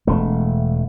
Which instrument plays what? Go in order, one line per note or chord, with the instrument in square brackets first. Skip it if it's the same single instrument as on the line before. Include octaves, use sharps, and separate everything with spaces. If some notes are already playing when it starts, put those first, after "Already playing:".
[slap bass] E1 A3